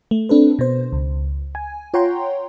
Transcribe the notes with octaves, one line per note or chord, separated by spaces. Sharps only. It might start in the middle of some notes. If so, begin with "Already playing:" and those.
A3
C4 D4 A4 B4
B2 C5
C#2
G#5
F4 C#5 F#5 G5 A#5 C6